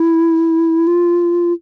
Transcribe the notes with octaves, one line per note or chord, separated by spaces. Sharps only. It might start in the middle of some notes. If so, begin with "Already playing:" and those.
Already playing: E4
F4